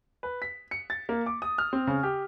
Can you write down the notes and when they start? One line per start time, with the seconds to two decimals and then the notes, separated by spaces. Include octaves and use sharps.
0.23 B4
0.42 B6
0.71 C#7
0.90 A6
1.09 A#3
1.26 D6
1.42 D#6
1.58 F6
1.73 C4
1.87 C#3
2.03 G4